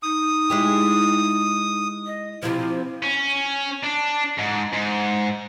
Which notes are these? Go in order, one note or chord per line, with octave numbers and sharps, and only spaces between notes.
D#4 D#6
G#3 E4 G4
D#5
C3 F3 E4
C#4
D4
G#2
G#2